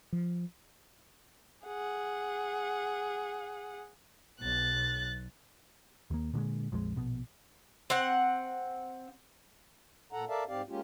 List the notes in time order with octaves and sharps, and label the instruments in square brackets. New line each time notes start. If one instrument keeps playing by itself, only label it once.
[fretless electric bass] F3
[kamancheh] G#4 F#5
[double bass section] B1 [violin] F#6 A6
[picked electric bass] D#2 A#3
A#2 D3 F3 G#3
A#1 F2 F3 G#3
A#1 B2
[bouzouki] C4 F#5
[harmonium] A#2 A4 F#5 A#5
A4 A#4 D5 E5 F5 A5
G#2 C4 G4 D5 F5
G#3 A#3 C#4 F4 G4